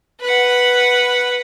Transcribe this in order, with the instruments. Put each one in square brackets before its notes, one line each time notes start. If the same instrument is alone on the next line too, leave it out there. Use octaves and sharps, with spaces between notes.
[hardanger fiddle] B4 F#5